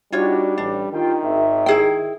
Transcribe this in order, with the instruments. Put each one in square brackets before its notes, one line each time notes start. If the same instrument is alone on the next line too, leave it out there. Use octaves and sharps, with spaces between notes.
[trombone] G3 [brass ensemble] D4 D#4 F#4 [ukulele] F4 C#5
[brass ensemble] A1 [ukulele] D4
[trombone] D#3 [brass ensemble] F4 G4 G5
[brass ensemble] G#1 E5
[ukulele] E4 G#4 G5